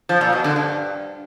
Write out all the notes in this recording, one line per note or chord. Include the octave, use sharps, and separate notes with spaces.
F3
A#2
B2
D3
G2